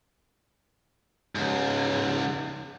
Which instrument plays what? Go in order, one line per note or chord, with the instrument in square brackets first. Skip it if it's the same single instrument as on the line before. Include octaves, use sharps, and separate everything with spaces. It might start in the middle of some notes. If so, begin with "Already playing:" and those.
[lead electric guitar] C#2 G#2